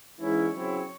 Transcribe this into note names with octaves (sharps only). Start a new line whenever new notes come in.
G#2 E3 G#3 C#4 E4 C#5
C#3 F#3 C4 E4